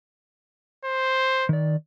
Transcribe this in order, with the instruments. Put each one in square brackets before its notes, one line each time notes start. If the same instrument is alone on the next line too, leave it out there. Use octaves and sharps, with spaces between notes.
[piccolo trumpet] C5
[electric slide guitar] D#3 D5